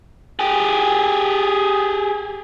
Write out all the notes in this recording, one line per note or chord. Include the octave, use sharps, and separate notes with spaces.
G4 G#4